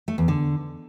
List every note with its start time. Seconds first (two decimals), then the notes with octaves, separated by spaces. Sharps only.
0.08 A3
0.18 E2
0.28 D3